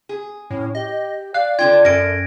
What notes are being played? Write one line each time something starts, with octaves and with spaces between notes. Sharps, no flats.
G#4
A2 C#4
G4 D#5
D5 F5 F#6
D3 D4 F4 G5 G#6
F#2 C#4 A4 A#6 D7